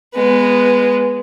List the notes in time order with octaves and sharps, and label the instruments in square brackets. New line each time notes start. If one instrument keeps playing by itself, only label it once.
[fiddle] G#3 B3